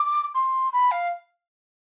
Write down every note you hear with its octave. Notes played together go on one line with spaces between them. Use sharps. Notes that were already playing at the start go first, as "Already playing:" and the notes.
Already playing: D6
C6
B5
F5